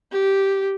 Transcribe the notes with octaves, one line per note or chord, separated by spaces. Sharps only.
G4